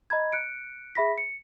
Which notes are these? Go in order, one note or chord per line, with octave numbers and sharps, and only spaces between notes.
D#5 A#5 B5 G#6
F#6 C#7 D7
G#4 E5 B5 A#6 B6
C#7